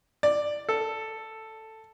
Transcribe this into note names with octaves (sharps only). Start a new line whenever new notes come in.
D5
A4